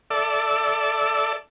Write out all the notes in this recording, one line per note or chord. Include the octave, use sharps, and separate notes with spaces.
A4 D5 E5